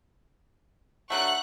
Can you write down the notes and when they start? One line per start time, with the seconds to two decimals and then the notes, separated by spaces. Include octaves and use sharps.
1.10 D3 F#3 A3 F#5 C#6 F#6